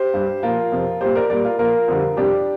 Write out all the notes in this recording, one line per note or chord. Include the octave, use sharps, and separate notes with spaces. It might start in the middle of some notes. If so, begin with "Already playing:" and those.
Already playing: G4 C5
G2 G3
A#2 F3 F4 A#4
F2 C3 F3
A#2 G3 G4 C5
A#4 D5
A#2 G3 A#4 D5
F4 A#4
A#2 F3 F4 A#4
F2 D3 G3
F2 C3 G3 D4 G4